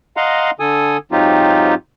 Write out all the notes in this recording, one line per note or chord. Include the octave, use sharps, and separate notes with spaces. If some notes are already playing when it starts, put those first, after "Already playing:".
D#5 F5 F#5 A#5 C6
D3 A4 G#5 D#6
G#2 F#3 C4 D#4 F4 G4